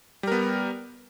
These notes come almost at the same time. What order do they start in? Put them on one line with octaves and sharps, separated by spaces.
G3 A#4 B3